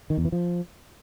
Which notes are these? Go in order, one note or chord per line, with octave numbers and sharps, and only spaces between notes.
D#3
E2
E3
F3